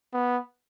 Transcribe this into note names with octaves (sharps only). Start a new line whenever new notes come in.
B3